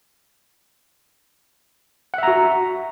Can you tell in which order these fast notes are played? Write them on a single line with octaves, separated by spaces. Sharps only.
F#5 E5 A#5 F#4